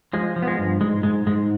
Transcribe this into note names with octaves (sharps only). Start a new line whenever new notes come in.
F3 G#3
F3
B3
G#3
G2
G#2 G#3
G#2 G#3
G#2 G#3